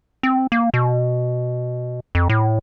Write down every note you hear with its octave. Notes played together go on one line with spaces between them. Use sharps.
C4
A#3
B2
F2
A2